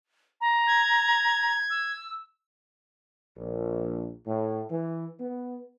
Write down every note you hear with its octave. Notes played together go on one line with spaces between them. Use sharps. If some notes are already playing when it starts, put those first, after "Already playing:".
A#5
G#6
E6
A#1
A2
E3
B3